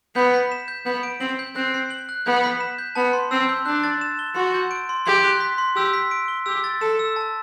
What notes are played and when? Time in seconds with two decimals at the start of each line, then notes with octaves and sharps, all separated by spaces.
0.16 B3 G6
0.34 B6
0.52 E7
0.68 G6
0.86 B3 G6
1.03 D7
1.20 C4 F#7
1.39 G6
1.56 C4 F#6
1.74 C7
1.90 F#7
2.09 F#6
2.26 B3 G6
2.44 B6
2.60 E7
2.78 G6
2.95 B3 A5
3.13 C6
3.31 C4 E6
3.49 G6
3.66 D4 F#6
3.84 A6
4.01 E7
4.19 G7
4.36 F#4 C6
4.54 G6
4.71 D7
4.89 C6
5.06 G4 C6
5.24 F#6
5.41 B6
5.58 C6
5.76 G4 E6
5.93 B6
6.11 D7
6.28 G7
6.46 G4 E6
6.64 A6
6.81 A4 E7
6.99 E6
7.16 A5